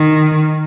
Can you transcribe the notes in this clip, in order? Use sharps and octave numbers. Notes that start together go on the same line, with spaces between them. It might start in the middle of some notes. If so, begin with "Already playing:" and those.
Already playing: D#3